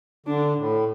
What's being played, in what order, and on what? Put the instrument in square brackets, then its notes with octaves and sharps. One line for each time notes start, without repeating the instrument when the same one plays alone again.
[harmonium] D3 [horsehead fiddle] D4
[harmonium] A2